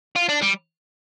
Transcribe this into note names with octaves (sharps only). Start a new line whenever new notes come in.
F4
D4
G3